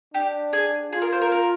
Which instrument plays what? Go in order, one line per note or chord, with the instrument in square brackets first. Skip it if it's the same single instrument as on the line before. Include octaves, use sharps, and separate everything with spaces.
[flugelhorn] D4 [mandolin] G4
[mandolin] G#4
[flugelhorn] F4 [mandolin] G#4
[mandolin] A#4
C5
A#4
A#4